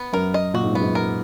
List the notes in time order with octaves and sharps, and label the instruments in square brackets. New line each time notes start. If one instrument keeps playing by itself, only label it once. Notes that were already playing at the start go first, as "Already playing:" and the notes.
Already playing: [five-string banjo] B3
[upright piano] F#2 [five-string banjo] A#4
[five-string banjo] D#5
[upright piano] A#2 [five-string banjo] F#4
[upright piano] G#2
[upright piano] F#2 [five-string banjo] B3
[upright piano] G#2
[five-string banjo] A#4